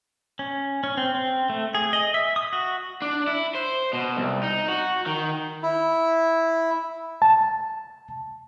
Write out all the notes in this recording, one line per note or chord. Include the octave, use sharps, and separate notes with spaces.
C#4
C#4
C4
C4
A3
G#4
D#5
E5
D#6
F#4
D4
E4
C5
B2
C2
D#4
F#4
D#3
E4
A5